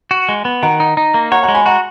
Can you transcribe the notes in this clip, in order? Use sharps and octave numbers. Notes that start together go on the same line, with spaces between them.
F#4
G#3
B3
D#3 F#5 A#5
D#4
D#4
A#3
C#5 F#5 A#5
F#5 A#5
G#3
G#5 B5
F#4 F#5 A#5